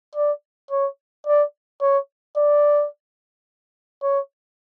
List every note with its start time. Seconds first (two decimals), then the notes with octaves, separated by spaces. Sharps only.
0.16 D5
0.71 C#5
1.27 D5
1.82 C#5
2.37 D5
4.03 C#5